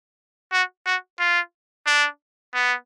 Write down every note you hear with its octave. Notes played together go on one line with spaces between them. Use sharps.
F#4
F#4
F4
D4
B3